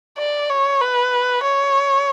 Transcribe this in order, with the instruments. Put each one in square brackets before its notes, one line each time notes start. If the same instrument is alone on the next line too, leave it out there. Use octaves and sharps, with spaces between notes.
[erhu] D5
C#5
B4
C#5